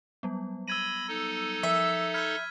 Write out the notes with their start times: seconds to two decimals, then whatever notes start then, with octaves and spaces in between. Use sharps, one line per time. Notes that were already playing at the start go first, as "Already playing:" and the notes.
0.23 F#3 G3 B3
0.68 B5 E6 G#6 A#6 D#7
1.08 D#4 A4
1.63 F3 E5
2.14 B5 E6 F6 G6 G#6 B6